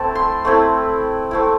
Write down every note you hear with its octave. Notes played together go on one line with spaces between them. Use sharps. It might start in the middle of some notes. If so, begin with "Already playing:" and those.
Already playing: A3 C4 E4 A5
C6
A3 C4 E4
A3 C4 E4